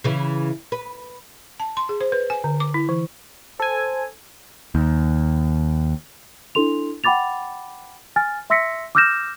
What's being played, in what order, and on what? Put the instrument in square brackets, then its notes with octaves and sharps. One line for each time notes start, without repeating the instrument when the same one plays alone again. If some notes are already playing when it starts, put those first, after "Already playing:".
[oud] C#3 E3
B4
[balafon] A5
C6
G#4
C5
B4
G#5
D3
D6
E4
E3
[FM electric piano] A4 G#5 [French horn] C5
[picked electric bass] D#2
[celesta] D4 E4 A4 C6 F7
F#5 G5 B5 D6 A6 F7
G#5 F6 A6
E5 C6 E6 A#6 B6 C#7
D6 E6 F6 G6 A#6 E7